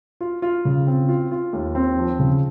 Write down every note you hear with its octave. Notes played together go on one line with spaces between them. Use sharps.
F4
F4
C#3
C4
F4
F4
D#2
C4
F3
C#3